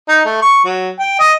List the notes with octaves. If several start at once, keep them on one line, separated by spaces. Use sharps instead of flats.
D#4
A3
C#6
F#3
G5
D#5